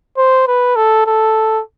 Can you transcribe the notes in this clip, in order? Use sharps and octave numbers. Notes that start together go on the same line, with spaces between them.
C5
B4
A4
A4